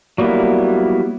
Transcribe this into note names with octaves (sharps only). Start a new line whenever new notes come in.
F#3 G3 A#3 B3 E4